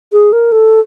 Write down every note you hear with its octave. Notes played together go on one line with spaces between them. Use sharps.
G#4
A#4
A4